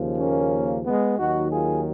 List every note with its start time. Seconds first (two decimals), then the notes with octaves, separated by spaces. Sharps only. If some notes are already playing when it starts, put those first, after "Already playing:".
Already playing: D#2 C#3 F3
0.18 A#3 C#4
0.84 G#3 B3
1.18 D#2 D#3 F#3 D#4 F#4
1.51 F4 G#4